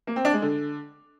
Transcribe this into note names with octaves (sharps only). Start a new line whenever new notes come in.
A#3
C4
D4
G#3
D3